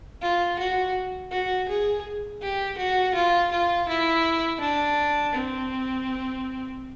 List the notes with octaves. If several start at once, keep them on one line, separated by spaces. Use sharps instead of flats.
F4
F#4
F#4
G#4
G4
F#4
F4
F4
E4
D4
C4